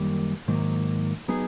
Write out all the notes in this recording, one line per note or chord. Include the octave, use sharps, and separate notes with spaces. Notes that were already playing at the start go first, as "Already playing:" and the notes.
Already playing: F#2 D#3 G3 A#3
G#2 D#3 F#3 A#3
F#3 B3 D#4 G#4